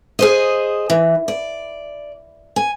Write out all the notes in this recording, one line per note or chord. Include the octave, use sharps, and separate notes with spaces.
G#4 C5 D#5
E3
D5
G#5